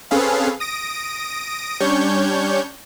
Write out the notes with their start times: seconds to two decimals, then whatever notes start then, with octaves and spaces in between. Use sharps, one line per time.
0.11 C4 C#4 G#4 A4 B4 F5
0.60 D#6 A#6 D7
1.80 G3 C#4 D4 C#5 C#6 G6